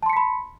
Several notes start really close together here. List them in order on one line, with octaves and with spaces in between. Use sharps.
A5 C6 C#7 B6 B5